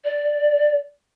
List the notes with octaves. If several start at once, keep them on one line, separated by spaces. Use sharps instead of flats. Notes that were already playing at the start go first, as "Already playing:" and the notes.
D5